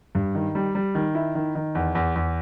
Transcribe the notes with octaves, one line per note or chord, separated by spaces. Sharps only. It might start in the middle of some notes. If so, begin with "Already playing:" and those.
G2
D#3
G3
G3
D#3
E4
D#3
D#3
E2
E2
E2